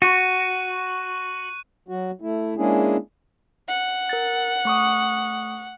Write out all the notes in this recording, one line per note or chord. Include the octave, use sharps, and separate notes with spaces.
F#4 C#6 F#6 D#7
F#3 F#4
A3 E4
G#3 A#3 C#4 D4 E4 G#4
F#5
A#4 A6
A3 C#6 D#6